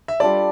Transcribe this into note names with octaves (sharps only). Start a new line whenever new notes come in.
E5
G3 D4 F4 A4 D5